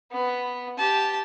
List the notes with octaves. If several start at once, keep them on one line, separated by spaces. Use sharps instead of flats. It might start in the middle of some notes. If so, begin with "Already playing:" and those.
B3
G4 A5